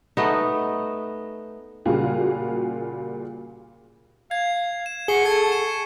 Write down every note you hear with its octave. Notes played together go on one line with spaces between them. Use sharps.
A3 B3 D#4
A#2 C#3 G3 F4 F#4 G#4
F5 G#6
E7
G#4 F#5 C#6 C7 G7
A4 C#6 G#6 C#7
E7